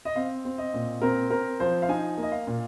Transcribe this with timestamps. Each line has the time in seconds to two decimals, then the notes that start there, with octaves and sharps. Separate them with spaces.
0.05 D#5
0.16 C4 F5
0.45 C4
0.58 D#5
0.74 A#2
1.02 C4 A#4
1.30 C4 A#4
1.60 F3 C5
1.82 F5
1.89 D#4 G#5
2.17 A#3
2.23 D#5
2.32 F5
2.47 A#2